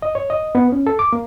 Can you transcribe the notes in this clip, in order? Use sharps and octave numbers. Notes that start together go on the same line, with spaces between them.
D#5
C#5
D#5
B3
C#4
A4
D6
A#3